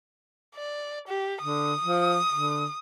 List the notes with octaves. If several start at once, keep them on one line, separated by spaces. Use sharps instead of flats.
D5
G4
D3 D#6
F3
D3